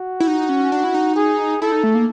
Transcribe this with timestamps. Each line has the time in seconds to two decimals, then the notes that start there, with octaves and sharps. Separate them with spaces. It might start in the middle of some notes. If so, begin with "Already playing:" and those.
Already playing: F#4
0.20 E4
0.27 D#4
0.49 C#4
0.72 D4
0.84 E4
0.94 D#4
1.16 G#4
1.62 E4 A4
1.72 D#4
1.83 A3
1.95 A#3